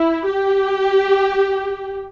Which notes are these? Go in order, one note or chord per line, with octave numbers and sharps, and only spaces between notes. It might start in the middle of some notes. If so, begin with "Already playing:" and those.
Already playing: E4
G4